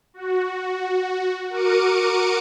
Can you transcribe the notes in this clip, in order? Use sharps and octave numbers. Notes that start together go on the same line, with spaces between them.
F#4
F#4 A#4 D6 C#7 D#7